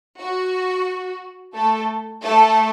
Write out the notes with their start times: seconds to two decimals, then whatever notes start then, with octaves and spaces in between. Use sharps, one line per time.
0.18 F#4
1.55 A3 A4
2.22 A3 A4